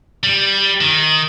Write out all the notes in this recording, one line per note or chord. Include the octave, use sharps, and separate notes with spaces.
G3
D#3